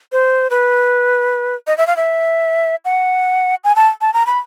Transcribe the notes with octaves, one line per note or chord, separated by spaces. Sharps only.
C5
B4
D#5
E5
F5
E5
F#5
G#5
A5
A5
A#5
B5